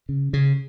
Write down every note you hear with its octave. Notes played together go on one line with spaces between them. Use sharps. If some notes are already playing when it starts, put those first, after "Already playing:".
C#3
C#3